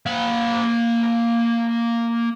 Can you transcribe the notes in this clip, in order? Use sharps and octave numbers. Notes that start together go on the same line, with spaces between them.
A#3 B5